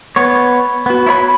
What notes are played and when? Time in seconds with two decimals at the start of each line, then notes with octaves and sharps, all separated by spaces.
0.16 B3 C#5
0.86 B3 F#4
1.07 E4 C#5 B5